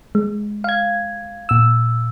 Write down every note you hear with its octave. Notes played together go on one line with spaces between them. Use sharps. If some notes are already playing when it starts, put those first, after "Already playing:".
G#3
F5 G#6
A#2 E6